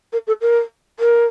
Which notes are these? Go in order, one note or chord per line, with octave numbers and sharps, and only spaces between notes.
A#4
A4
A#4
A#4